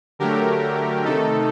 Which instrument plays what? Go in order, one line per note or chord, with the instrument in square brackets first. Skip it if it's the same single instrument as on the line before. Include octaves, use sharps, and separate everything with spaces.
[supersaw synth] D3 F#3 A3 G4 A#4
C3 D#3 A3 D#4 A4